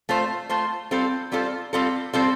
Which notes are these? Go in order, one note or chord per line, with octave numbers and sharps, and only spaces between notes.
A3 F4 C5
A3 F4 C5
G3 C4 F4 A4 C5
G3 C4 F4 A4 C5
G3 C4 F4 A4 C5
G3 C4 F4 A4 C5